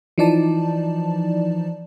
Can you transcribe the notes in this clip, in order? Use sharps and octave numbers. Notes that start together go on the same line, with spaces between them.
E3 F3 D#4 D5 A5